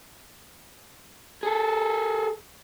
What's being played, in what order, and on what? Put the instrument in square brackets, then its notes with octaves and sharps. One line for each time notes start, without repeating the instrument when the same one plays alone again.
[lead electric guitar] G#4 A4